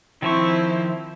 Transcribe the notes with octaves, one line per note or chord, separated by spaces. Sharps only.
D#3 F3 C4 E4 C#6